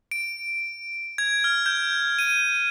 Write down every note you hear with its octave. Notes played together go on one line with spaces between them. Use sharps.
D7
G#6
F6
G6
D#7